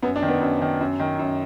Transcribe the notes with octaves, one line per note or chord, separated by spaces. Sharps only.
F#2 B3
D4
D#3
B3
F#2
D#3
F#2
D#3
F#2